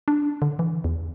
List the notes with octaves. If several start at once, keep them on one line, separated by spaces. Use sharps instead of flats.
D4
D3
E3
E2